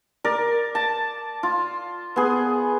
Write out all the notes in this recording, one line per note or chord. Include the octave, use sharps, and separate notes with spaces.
A#4 D5
A5
F4
B3 G#4